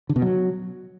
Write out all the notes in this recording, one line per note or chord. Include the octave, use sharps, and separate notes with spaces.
D3
B2
F#3